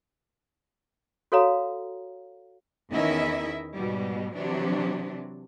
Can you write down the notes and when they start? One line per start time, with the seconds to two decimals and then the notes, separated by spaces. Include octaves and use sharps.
1.32 F#4 A4 C#5 F5 A#5
2.91 E2 D#3 C#4 E4 D#5 E5
3.74 G#2 B2 G3
4.34 C3 E3 F#3 D4